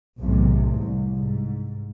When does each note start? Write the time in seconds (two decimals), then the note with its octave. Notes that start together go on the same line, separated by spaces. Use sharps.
0.18 B1 E2 A2 C3
0.73 C2
1.15 G#2